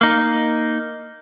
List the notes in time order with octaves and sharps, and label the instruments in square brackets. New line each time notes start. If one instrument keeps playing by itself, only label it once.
[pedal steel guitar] A#3 D#4